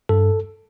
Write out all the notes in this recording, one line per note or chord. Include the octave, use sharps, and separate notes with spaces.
G2 A4